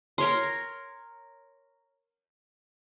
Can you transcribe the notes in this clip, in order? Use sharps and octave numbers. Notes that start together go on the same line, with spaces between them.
A#4 C#5 C6